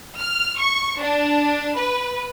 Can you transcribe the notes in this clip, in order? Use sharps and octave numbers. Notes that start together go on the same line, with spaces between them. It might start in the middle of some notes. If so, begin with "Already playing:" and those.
F6
C#6
D4
B4